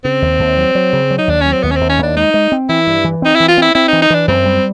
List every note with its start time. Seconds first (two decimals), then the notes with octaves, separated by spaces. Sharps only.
0.04 C#3 C4
0.22 D#2
0.39 D#2
0.57 F#3
0.75 F#3
0.93 C#3
1.11 F#3
1.18 D#4
1.28 D#2 D4
1.41 F#3 C#4
1.52 C4
1.63 D#2 B3
1.71 C#4
1.76 C4
1.81 D#2
1.90 C#4
1.99 D#2 D4
2.16 G#3 D#4
2.34 G#3
2.52 C4
2.69 E3 E4
2.87 G2
3.04 E3
3.22 C4 D#4
3.36 E4
3.40 E3
3.48 F4
3.58 C4 E4
3.74 C4 E4
3.88 D#4
3.93 E3
4.02 D#4
4.10 E3 D4
4.28 F#2 C4
4.45 G3